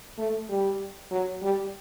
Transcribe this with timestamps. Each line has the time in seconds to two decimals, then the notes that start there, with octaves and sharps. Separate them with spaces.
0.18 A3
0.49 G3
1.11 F#3
1.42 G3